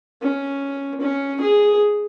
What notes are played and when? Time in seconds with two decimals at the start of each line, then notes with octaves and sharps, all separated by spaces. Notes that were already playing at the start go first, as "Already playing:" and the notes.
0.22 C#4
1.01 C#4
1.41 G#4